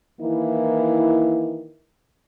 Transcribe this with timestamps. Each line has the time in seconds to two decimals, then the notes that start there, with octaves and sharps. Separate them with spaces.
0.20 D#3 E3 A#3 E4